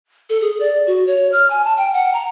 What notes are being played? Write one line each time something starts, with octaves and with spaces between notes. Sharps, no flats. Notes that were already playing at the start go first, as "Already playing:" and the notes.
A4
G#4
D5
F#4
C#5
F6
G#5
A5
G5
F#5
A#5